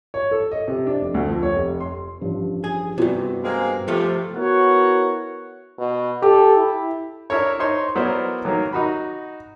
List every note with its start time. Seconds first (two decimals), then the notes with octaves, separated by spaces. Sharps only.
0.14 C#5
0.31 A4
0.51 D#5
0.68 C3
0.87 D4
1.01 F1
1.14 D2
1.28 F2
1.43 C#5
1.56 F1
1.80 C6
2.21 A1 G2 F3
2.64 G#4
2.98 G2 C3 B3 F#4
3.43 G#3 A#3 C4
3.88 C3 F3 A3 F4
4.36 B3 E4 F#4 A#4 C#5 F#5
5.78 B2
6.22 G4 A4
6.57 E4
7.30 D4 E4 A#4 C#5
7.59 D#4 C5 C#5 C6
7.95 F#3 B3 E4 A#4 C5 D5
8.45 D#3 F#3 A#3 A#4
8.73 D#4 F#4 B5